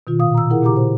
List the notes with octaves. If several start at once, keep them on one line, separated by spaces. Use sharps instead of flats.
B2 D#3 F4
A#2 F5 D#6
A#5 E6
E4 G#4 A#4 F#5
A#2 C#3 G4 A#5 D6
C5